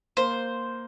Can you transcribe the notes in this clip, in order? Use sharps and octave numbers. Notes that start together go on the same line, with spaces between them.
A#3 C5